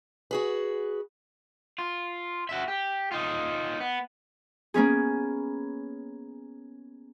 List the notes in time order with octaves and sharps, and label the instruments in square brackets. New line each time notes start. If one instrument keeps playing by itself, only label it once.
[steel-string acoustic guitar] F#4 G#4 B4
[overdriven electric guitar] F4
F#4 E5
G4
D#4 F4
B3
[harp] A#3 B3 C#4 G#4